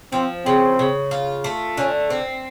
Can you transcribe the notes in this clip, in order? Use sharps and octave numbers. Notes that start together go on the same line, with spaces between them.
F3 C4
C#3 C4
C#3
F4
A3
D3 C#4
C4